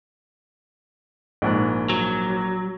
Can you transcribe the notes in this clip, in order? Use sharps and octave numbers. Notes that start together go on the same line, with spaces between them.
A#1 G#2 F#6
F#3